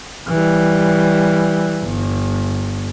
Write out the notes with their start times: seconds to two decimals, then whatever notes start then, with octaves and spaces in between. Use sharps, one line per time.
0.28 E3 G3
1.83 G1